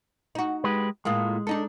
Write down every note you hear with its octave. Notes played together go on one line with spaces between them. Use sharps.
D#4 F#4
G#3 G4 B4
A2 G#3 A#3 F4
D4 D#4 A4